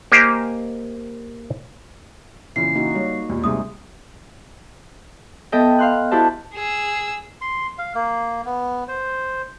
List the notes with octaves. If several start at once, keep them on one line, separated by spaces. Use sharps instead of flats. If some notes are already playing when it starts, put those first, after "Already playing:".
A#3 G4 C5 D#5 F5 G#5
A#2 C#3 E3 C7
A#3 D#4 F#4
G3 C#5
D#2 A#2
G2 C3 G#3 D#4 D#6
B3 A4 D#5 E5 G5
F5 C6 F#6
E4 F#4 G4 C5 D5 A5
G#4 E6
C6
F5
A#3
B3
C5